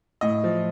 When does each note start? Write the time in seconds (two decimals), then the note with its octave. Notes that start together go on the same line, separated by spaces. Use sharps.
0.21 A2 D#5
0.44 F3